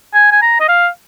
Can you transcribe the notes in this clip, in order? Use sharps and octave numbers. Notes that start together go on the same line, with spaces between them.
G#5
G#5
A#5
D#5
F5